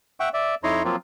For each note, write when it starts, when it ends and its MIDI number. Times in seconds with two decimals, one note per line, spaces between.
0.20 0.29 76
0.20 0.29 78
0.20 0.29 79
0.20 0.29 85
0.34 0.55 74
0.34 0.55 76
0.64 0.83 41
0.64 0.83 63
0.64 0.83 64
0.64 0.83 73
0.64 0.83 82
0.64 0.83 84
0.84 0.96 53
0.84 0.96 54
0.84 0.96 58
0.84 0.96 60
0.84 0.96 65